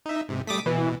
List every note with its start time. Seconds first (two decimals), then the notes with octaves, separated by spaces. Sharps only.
0.06 D#4 E5
0.29 G#2 C3
0.47 G3 A3 D6 D#6 B6
0.66 B2 E3